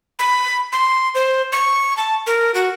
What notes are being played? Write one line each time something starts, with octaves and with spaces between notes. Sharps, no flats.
B5
C6
C5
C#6
A5
A#4
F#4